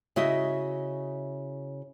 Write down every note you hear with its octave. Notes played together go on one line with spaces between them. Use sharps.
C#3 E4 F#4 D#5 E5